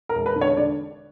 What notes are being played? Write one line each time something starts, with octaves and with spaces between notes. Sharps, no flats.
A#4
E1
B4
D3
C#5
D3 D5